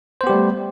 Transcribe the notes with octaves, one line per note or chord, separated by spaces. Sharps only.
G3 A3 B3 G4 C5